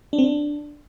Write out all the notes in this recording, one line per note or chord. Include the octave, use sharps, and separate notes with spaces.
D4
C4
D4